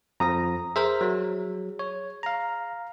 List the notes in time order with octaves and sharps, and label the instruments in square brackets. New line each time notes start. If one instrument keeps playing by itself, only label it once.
[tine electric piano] F2 F3 A#6 [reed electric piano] A#5 D#6
[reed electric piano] G#4 [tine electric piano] A#4 C5 E5
[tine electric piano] F#3
C#5
F5 A#5